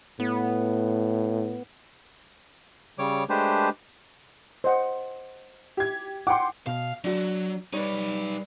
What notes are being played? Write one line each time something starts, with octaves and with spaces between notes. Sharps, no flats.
A2 B3
C#3 G3 C#5 D6
G#3 A3 D4 G4 B4 C5
C5 D#5 F#5
G4 G#6
F#5 G5 C6 D6
B2 F5
F#3 D4 F#4
G3 D#4 B4 C#5